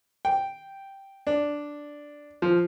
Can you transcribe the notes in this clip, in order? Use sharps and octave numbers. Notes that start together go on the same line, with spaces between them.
G5
D4
F3